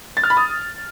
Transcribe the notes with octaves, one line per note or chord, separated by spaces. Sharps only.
A6
F6
B5
D#6